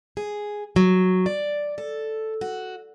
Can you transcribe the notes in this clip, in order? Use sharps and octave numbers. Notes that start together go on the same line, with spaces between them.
G#4
F#3
D5
A4
F#4